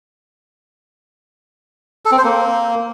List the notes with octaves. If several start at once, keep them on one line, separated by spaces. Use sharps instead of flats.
A4
C4
C5
A#3